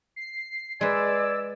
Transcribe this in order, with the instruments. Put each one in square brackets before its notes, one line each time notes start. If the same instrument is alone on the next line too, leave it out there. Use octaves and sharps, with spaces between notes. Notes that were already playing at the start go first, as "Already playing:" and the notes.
[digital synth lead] C7
[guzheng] G#3 B4 [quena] D5 [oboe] G#5 [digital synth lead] E6